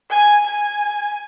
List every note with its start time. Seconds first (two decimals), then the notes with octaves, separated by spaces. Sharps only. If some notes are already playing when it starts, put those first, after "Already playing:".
0.11 G#5
0.47 G#5